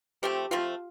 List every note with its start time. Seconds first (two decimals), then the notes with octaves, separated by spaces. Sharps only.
0.23 F3 A3 C4 G4
0.51 F3 A3 C4 F4